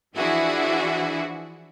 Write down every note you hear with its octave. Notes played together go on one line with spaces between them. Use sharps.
E3 F3 D4 E4 F#4 G#4